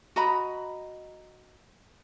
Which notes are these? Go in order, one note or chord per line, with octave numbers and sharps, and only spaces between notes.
F#4 D#5 A#5 B5